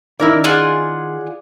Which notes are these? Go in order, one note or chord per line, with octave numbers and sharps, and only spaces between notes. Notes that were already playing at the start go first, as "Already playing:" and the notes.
D#3 C#4 D#4 E4 A#4 D5
F4 G#4 D5 F#5